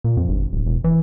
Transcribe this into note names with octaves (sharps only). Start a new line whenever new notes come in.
A#2
F2
G1
D1
E1
E3